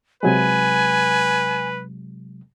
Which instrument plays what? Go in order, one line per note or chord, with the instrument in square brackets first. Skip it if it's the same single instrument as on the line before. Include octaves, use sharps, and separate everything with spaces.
[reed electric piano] C3 F#3 G#3 [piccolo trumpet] B4 [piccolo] G#5